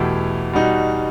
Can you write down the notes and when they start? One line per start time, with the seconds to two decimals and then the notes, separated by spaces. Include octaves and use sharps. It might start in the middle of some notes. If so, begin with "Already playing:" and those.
Already playing: E2 B2 A3 E4 G4
0.53 B2 G3 D#4 F#4